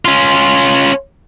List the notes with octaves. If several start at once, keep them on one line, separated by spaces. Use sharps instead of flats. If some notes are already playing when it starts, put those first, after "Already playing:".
C#4 F4